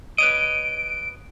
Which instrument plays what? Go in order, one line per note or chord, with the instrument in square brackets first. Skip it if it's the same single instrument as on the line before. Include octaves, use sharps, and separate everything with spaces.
[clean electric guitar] B4 C#5 D#5 [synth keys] D7